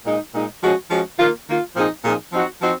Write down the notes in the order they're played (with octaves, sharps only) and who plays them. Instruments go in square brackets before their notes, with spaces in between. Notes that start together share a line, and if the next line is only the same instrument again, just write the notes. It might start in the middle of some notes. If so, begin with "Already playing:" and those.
[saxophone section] A#2 G#3 D#4
A#2 G#3 D#4
F3 G#3 C#4 F#4
F3 G#3 C#4 F#4
D#3 A#3 F4
D#3 A#3 F4
A#2 F3 C4 D#4 G#4
A#2 F3 C4 D#4 G#4
F3 C4 D#4 F#4
F3 C4 D#4 F#4